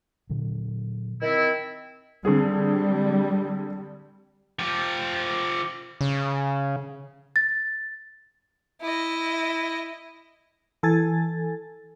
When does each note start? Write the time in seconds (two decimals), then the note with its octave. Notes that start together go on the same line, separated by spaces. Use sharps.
0.30 A#2 D3 F#3
1.22 D#3 C4 E4
2.25 D3 G3 C4 G#4
4.59 F3 G4
6.01 C#3
7.36 A6
8.81 E4 D#5
10.83 E3 A4 G#5 A6